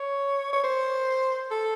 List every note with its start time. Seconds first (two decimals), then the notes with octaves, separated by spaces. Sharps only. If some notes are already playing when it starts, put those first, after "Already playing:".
Already playing: C#5
0.53 C#5
0.64 C5
1.51 A4